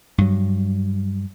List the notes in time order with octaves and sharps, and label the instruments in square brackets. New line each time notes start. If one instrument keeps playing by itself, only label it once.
[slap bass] G2 F#3